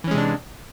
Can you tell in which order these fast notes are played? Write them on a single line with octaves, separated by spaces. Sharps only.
E3 C#4 G#3 C3 D4